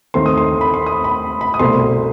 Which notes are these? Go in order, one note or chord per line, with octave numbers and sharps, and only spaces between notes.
D#2 D#3 A3 C4 C6
D#6
C6
B5
C6
D#6
B5
B5
D#6
C2 B2 A3 C4 C6